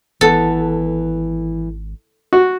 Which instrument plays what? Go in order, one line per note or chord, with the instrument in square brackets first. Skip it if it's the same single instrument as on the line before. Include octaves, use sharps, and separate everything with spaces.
[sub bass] G#1 [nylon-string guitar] E3 B3 [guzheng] A4
[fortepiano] F#4